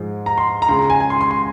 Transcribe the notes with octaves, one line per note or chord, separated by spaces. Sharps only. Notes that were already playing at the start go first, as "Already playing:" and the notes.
Already playing: G#2 F3 G#3
A#5
C6
A#5
C#2 C#3 G#3 C6
A#5
G#5
G#5
C6
C6
C6